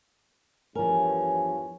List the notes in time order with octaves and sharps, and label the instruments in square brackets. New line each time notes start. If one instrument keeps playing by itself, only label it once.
[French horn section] E2 G2 C#5 [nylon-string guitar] F3 A#4 [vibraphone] G#5